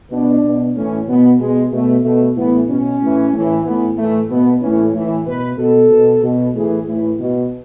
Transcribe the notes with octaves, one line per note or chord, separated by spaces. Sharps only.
B2 D4
B2
A2 E3 C#4
B2 B3
B2 G#3
B2 A3
B2 A3
A2 E3 B3
B2 C#4
A2 E3
A2 E3
A2 E3 B3
A2 E3 A3
B2 B3
A2 E3 C#4
A2 E3
B2 B4
B2 A4
B2
B2
A2 E3 G#4
A2 E3 E4
B2